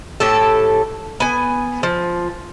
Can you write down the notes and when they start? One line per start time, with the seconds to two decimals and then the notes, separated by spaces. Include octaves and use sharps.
0.20 A2 G4 A4
1.20 B3 G#5
1.83 F3